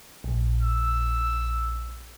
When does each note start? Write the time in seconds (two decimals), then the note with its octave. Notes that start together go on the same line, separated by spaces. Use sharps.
0.24 A#1
0.62 E6